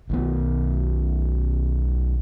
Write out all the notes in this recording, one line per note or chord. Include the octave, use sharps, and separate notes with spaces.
B1 D#3 B3